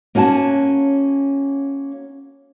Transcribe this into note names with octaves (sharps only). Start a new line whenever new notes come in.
A#3 C#4 F#4 G#5 A5